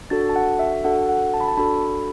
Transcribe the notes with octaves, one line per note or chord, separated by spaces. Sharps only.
D4 F#4 A4 A6
A5
F#5
E5
D4 F#4 A4 F#5
F#5
A5
B5
A5
D4 F#4 A4 B5